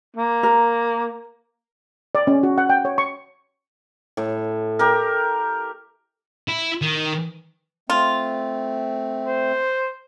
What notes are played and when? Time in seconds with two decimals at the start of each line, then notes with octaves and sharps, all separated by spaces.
0.17 A#3
0.43 A#4
2.15 D5
2.27 C#4
2.43 F#4
2.58 F#5
2.70 G5
2.85 C#5
2.98 C#6
4.17 A2
4.79 G4 A#4
6.49 E4
6.82 D#3
7.90 A3 C4 F4
9.27 C5